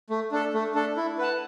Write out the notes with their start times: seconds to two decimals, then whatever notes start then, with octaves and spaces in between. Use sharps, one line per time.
0.10 A3
0.32 D4 A4
0.53 A3
0.75 D4 A4
0.97 E4
1.18 B4 F#5 A5